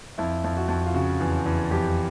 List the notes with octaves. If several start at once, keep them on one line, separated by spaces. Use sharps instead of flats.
F2 E4
F2
F#4
F2
F4
C#3 F#4
E2
E2
F2 G4